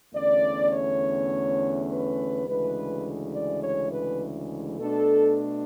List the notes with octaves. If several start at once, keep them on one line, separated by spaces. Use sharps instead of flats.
E2 D3 A3 C#4 D5
C#5
B4
D2 C#3 E3 G#3 B4
D5
C#5
B4
B2 A3 D4 A4